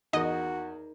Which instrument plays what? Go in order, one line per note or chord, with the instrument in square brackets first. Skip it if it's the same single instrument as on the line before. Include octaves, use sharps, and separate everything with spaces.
[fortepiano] E2 D#6 [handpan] D#4 A#4 [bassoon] F#4 [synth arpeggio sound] D#5